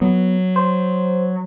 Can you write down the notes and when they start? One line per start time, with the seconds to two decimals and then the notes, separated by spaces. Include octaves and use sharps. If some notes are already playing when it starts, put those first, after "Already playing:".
0.01 F#3 B3
0.56 C5